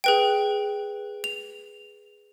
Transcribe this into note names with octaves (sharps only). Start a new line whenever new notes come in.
G#4 B4 G5
F7